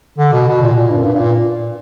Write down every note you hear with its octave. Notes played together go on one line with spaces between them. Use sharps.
D3
B2
B2
A#2
A#2
G2
F#2
G2
G2
A#2